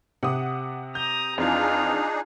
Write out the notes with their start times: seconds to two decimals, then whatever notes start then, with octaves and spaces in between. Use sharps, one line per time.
0.23 C3 F#5 D#6
0.95 A#5 D#6 G6
1.38 F2 E3 C4 D4 D#4 F4 G#4 F5